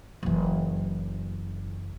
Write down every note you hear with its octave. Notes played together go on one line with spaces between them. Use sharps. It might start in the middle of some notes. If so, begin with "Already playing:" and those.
F#1 E3